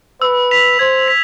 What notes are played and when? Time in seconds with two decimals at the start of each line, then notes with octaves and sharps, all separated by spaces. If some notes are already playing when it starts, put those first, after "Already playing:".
0.22 B4 E6
0.51 B6 F7
0.79 C5 G#6
1.08 B6